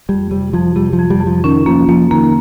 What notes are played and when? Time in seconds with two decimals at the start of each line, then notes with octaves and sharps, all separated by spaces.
0.09 F2 G3
0.31 C3 G3
0.53 F2 F3
0.76 C3 G3
0.93 F3
0.99 F2
1.10 G3
1.21 F2
1.27 F3
1.44 D#3 C#4
1.66 F3 A#3
1.88 F3 A#3
2.11 D#3 A#3